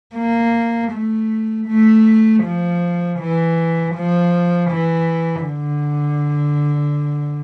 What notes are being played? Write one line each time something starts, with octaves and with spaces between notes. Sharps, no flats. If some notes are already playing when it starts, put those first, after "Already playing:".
A#3
A3
A3
F3
E3
F3
E3
D3